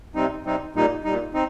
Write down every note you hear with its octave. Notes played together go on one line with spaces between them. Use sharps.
C3 G3 C4 D#4
C3 G3 C4 D#4
A#2 G3 D#4
A#2 G3 D#4
C4 D#4